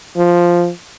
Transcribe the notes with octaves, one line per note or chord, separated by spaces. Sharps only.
F3